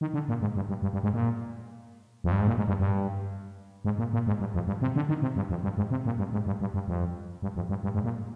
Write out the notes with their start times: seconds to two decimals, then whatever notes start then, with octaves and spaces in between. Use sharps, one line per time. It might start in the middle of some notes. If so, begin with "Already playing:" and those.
0.01 D#3
0.14 D3
0.29 A#2
0.41 G#2
0.55 G2
0.69 G2
0.82 G2
0.93 G2
1.03 G#2
1.14 A#2
2.24 F2
2.32 G2
2.40 G#2
2.47 A#2
2.58 G#2
2.68 G2
2.79 G2
3.85 G#2
3.98 A#2
4.13 A#2
4.27 G#2
4.40 G2
4.54 F2
4.67 G2
4.81 C3
4.96 D3
5.09 D#3
5.22 C3
5.36 G2
5.50 F2
5.63 G2
5.77 G#2
5.91 C3
6.06 A#2
6.18 G2
6.33 G#2
6.46 G2
6.61 G2
6.74 G2
6.88 F2
7.42 G2
7.56 F2
7.69 G2
7.83 G2
7.94 G#2
8.04 A#2